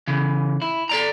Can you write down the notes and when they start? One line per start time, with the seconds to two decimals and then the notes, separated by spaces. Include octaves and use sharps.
0.08 C#3 E3
0.62 E4
0.89 A4 D5 A#5